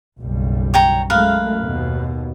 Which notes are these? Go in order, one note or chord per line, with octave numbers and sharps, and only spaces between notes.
F#1 B1 G3
C#5 G5 A#5
F#2 G#3 A3 A#4 B4 F5
D#2 B2